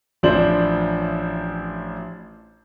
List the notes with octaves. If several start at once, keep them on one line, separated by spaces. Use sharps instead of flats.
A1 F3 D4 E4 C5 F#7